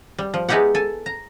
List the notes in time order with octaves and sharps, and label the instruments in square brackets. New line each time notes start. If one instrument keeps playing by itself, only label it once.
[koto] G3
F3
G#3 B3 D#4 E4 G4 F#5
A4 G#5
A#5